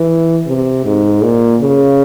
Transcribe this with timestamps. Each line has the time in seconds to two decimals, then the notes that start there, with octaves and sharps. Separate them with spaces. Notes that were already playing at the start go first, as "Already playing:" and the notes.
Already playing: E3
0.46 C3
0.85 G#2
1.22 A#2
1.61 C#3